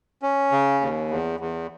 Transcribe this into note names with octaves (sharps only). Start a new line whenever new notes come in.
C#4
C#3
D#2
E2
E2